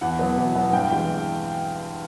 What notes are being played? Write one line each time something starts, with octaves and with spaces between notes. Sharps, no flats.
E2 F#5
B2 F#3 B3
E2
B2 F#3 B3
G2 G5
E3 G#3 G5